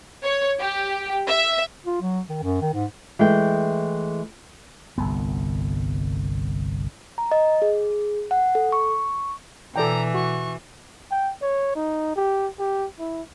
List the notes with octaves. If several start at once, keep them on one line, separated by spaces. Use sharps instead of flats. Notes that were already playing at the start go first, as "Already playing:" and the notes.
C#5
G4
E5
F4
F#3
D#3
F#2
D#3
G#2
E3 G#3 A3 G5
G1 C2 B3
A#5
D#5
G#4
F#5
A4
C#6
B2 E3 A4 D5 G5 A#5
F#4 C#6
G5
C#5
D#4
G4
G4
E4